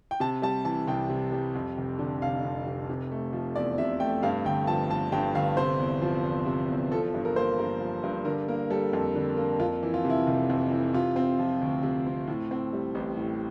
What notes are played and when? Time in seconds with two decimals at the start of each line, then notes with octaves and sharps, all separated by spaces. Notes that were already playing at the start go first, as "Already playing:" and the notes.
0.11 G5
0.20 C3 A5
0.42 G3 A5
0.65 E3 A5
0.88 C2 G5
1.09 C3
1.32 G3
1.55 F2
1.78 F1
1.99 D3
2.22 F1 F5
2.45 F2
2.67 F1
2.89 C3
3.11 A3
3.33 F3
3.56 E2 D5
3.78 C3 E5
4.00 A3 G5
4.23 G2 F5
4.45 G1 G5
4.67 F3 A5
4.90 G1 A5
5.12 G2 G5
5.35 G1 F5
5.57 C3 C5
5.79 E2
6.02 F3
6.24 E2
6.46 C3
6.68 E2
6.91 F3 A4
7.14 G2
7.25 A#4
7.36 A#3 C5
7.58 G2 A#4
7.80 F3
8.04 G2
8.25 D3 A#4
8.48 A#3 A#4
8.70 G3 A4
8.93 F2
9.15 D3
9.37 A#3
9.59 F2 F4
9.83 E3
9.94 F4
10.05 C3 E4
10.27 F1
10.50 F2
10.71 E3
10.94 C3 F4
11.16 C4
11.39 F3
11.61 D2
11.83 C3
12.06 C4
12.28 A2
12.51 C4
12.73 G3
12.95 A1
13.17 A2